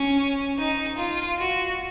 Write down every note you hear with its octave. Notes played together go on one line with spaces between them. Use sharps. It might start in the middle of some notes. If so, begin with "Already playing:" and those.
Already playing: C#4
D#4
F4
F#4